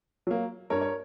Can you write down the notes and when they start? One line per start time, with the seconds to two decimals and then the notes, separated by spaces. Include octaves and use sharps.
0.27 F#3 A#3
0.70 G2 A#4 C#5
0.81 C#5